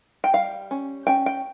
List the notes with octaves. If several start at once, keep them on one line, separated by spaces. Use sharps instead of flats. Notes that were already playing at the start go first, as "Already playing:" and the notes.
G5
G3 F5
C#4
C#4 G5
G5